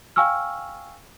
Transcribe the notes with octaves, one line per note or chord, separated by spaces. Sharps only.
F5 G5 G#5 C#6 E6 F6